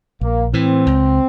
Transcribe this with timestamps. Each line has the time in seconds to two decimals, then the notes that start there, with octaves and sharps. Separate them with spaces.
0.21 A#1 A#3
0.53 A2 E3 C4
0.86 C#2